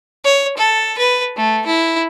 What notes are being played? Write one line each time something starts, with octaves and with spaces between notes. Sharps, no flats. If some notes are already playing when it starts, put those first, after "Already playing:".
C#5
A4
B4
A3
E4